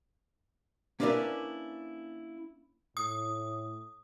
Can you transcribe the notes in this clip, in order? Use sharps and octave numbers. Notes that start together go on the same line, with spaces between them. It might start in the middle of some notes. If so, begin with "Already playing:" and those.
A#3 C#4 D4 E4 A#4 B4
A2 D#6